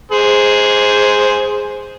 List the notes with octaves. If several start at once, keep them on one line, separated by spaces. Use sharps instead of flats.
G#4 C5